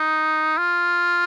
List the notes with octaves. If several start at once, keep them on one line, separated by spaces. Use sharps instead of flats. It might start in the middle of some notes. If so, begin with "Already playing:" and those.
Already playing: D#4
F4